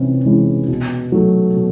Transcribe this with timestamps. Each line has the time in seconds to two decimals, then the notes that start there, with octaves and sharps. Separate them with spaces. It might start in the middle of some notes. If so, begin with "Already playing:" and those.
Already playing: C3 E3 C#4
0.25 E3 G#3 C#4
0.68 B2
1.12 F#3 A3
1.56 B2